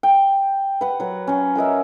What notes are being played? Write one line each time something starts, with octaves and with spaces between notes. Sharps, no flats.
G5
B4 F#5
F#3 B4
F#3 C#4
F#4 A#4 D#5 E5